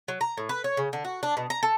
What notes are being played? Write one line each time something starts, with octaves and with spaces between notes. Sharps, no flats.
F#3
A#5
A2
B4
C#5
C#3
D3
F#4
D4
B2
A#5
A4